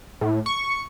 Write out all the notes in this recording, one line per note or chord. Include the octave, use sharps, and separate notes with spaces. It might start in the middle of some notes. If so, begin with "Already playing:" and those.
A2
C#6